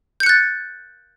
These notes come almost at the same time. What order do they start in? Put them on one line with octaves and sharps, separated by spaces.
G6 C#7 F#6 A6